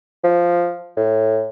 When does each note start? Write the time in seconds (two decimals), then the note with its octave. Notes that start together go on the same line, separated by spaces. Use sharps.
0.24 F3
0.97 A2